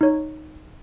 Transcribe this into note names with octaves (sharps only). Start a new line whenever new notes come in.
D#4 C#5